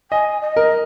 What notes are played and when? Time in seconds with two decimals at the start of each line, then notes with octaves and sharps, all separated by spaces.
0.11 D#5 G#5
0.41 D#5
0.56 A#4